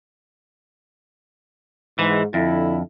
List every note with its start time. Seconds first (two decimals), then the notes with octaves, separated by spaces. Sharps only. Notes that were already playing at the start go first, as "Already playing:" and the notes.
1.99 G#2 E3
2.34 F2 D3 E4